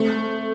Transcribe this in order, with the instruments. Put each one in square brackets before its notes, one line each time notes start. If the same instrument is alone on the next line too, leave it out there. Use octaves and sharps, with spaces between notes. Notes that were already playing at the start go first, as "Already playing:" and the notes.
Already playing: [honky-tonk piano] A3 [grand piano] C4